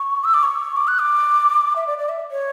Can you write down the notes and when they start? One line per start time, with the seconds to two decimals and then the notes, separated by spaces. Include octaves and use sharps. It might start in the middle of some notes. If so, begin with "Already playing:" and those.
Already playing: C#6
0.24 E6
0.34 D6
0.43 C#6
0.77 D6
0.88 F#6
0.99 D6
1.76 E5
1.87 D5
1.98 D5
2.09 E5
2.31 C#5